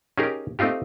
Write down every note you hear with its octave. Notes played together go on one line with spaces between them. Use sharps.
C#4 D#4 G4 G#4 A#4
A3 C4 D#4 F4 G4